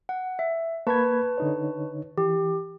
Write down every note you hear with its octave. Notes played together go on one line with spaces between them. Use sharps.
F#5
E5
A#3 B4 A5 B5 C#6 G#6
D3 D#4 C#5
E3 G4